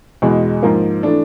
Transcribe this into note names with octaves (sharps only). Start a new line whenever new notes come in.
E2 B2 G#3
G#2 F3 A#3
E3 A3 D4